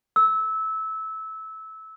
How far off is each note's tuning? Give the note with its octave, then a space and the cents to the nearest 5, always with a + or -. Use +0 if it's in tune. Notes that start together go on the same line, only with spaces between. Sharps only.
E6 -20